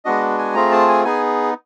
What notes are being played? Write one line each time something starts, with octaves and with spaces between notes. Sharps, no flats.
G#3 B3 D4 F#4 D#5
G#5
A3 C4 F4 G#4 A#5
A5
G#5
B3 D#4 G#4 G#5